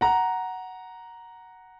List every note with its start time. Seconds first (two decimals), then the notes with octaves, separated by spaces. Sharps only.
0.01 F#5 A#5